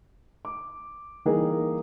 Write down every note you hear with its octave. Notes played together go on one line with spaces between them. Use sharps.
D6
E3 G3 A#3 D#4 G#4 A#4